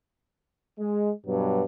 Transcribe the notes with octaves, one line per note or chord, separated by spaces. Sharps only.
G#3
G2 B2 F#3